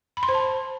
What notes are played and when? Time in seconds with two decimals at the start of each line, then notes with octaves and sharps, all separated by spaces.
0.17 B5
0.23 C6
0.29 C5
0.34 A5